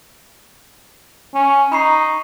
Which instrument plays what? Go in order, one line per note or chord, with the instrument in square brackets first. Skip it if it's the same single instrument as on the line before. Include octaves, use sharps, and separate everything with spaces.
[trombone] C#4
[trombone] D#4 [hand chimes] B5 C#6 C7